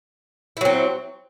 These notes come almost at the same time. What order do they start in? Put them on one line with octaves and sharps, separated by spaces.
E4 F#3 C4